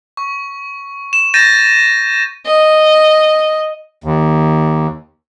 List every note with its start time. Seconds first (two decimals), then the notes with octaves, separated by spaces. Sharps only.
0.17 C#6
1.13 E7
1.34 G6 A6 A#6 D#7 E7
2.46 D#5
4.04 D#2